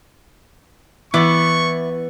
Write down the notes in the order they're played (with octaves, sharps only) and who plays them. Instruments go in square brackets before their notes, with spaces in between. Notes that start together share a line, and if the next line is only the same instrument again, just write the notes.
[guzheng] E3 B3 D5 [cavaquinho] E4 D6 [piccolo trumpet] C#6